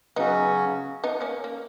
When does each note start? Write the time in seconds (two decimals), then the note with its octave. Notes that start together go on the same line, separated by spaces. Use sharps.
0.16 C#3 F#3 B3 C#4 D#4 F#4
1.04 B3 D#4
1.21 A#3 C#4
1.44 A#3